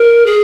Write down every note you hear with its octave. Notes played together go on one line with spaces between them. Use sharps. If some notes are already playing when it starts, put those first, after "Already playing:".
Already playing: A#4
G#4